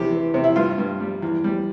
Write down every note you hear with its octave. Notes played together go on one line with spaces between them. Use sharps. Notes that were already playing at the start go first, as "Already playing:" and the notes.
Already playing: E2 C3 G4
E3
C3
E4
G2 F4
G2
G3
E2
G3